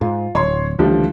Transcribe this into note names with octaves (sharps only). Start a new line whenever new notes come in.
G#2 F4
D1 C#5 C6
C#2 D3 E3 F3 G3 A3